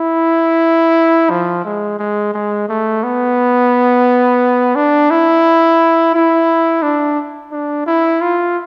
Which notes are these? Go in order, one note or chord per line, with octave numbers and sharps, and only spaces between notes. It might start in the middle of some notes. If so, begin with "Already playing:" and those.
Already playing: E4
F3
G#3
G#3
G#3
A3
B3
D4
E4
E4
D4
D4
E4
F4